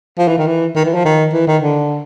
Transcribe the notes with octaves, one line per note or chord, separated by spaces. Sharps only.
F3
E3
D#3
E3
D#3
E3
F3
D#3
E3
D#3
D3